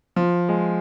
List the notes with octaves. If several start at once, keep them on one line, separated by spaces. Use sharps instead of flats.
F3
G#3